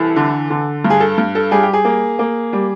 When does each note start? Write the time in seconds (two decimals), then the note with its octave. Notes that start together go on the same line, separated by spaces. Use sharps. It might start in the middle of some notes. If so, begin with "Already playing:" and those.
Already playing: C2 E3 A4
0.16 D3
0.50 D3
0.84 G2
0.90 G#4
1.00 A4
1.18 G2
1.35 A4
1.51 G3 G#4
1.63 G4
1.73 G#4
1.85 A#3
2.19 A#3
2.53 G3